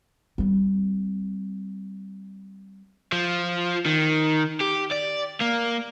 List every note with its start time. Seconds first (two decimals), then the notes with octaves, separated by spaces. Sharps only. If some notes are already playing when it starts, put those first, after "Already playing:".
0.38 G3 C4
3.12 F3
3.86 D#3
4.61 G4
4.92 D5
5.41 A#3